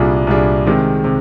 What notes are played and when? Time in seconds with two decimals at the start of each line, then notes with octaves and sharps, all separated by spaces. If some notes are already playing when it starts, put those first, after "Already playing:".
Already playing: C2 A#2 G3 D4 G#4
0.27 C2 A#2 G3 D4 G#4
0.66 C3 D#3 G#3
1.04 C3